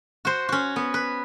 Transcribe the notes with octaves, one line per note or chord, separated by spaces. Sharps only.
F#4 C5
C#4 F#4
B3
B4